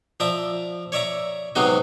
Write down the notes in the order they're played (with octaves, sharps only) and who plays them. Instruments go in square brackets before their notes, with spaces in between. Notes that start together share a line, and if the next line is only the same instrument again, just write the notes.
[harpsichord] F3 D5 E5 A#5
C#5 D5 E5 A#5
G#2 C3 F#3 B3 D#4 D#5